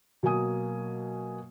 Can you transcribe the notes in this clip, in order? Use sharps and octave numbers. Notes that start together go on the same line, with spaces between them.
B2 F#3 A#3 G#5 D#6